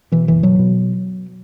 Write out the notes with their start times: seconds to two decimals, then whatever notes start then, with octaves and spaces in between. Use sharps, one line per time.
0.12 B2 E3
0.27 F#1 E3
0.43 B2 F#3
0.59 B2